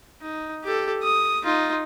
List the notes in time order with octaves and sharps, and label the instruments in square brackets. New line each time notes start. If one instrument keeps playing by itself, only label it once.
[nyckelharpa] D#4
G4 A4
D#6
D#4 F4